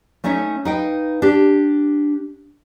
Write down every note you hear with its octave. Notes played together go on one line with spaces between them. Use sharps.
A3 C#4 D#4 C#5 E5
D#4 B4 D#5 F5 G5
D4 G4